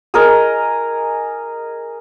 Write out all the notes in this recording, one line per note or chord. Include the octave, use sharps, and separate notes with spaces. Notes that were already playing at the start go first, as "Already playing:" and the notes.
G#4 A#4 D#5